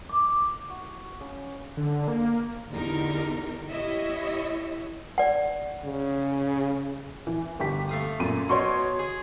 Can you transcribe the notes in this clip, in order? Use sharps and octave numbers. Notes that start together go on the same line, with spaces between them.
D6
F#4
C#3
D3
A#3
E2 D3 D#4 G4 A#4
E4 G4 C#5 D#5 E5
D5 F#5
C#3
E3
G1 G4 B6
A3 F5 D#6
F#2 A#2 D#7
B2 C#5 C6 C#6
G#4